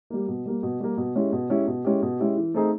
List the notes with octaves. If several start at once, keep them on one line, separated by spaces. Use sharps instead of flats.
G3 A#3
B2
G3 A#3
B2
G3 A#3
B2
G#3 C#4 E4 G4
B2
G#3 C#4 E4 G4
B2
G#3 C#4 E4 G4
B2
G#3 C#4 E4 G4
E3
A3 C4 D#4 G#4